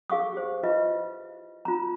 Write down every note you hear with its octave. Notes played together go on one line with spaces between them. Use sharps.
G#4 F5 C#6 D#6
G4 C5
E4 F4 B4 D#5 E5
F4 A#5